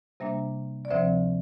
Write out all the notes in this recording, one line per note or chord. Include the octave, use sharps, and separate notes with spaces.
C3 G3 A#3 D4 C5 E5
D5
D2 C3 F3 C4 C5 E5